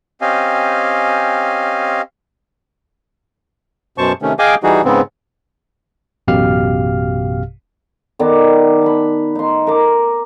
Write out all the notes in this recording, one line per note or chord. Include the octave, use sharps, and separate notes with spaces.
C4 C#4 G4 D#5 F5 G#5
F#2 B2 C5 A5 C#6
C3 D#3 A3 C#4
G#4 D#5 F5 G5 G#5 D6
E3 G3 D#4 F#4 G#4
G#2 C#3 B3 C4
A1 F#2 B2 G4 F5 F6
D#3 B3 D5
A5 B5
D#4 C6
A#4 D6